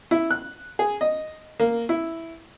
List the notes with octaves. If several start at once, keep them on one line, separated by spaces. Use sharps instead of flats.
E4
F#6
G#4
D#5
A#3
E4